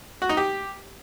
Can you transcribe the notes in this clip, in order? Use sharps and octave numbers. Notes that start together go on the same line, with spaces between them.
F#4
D#4
G4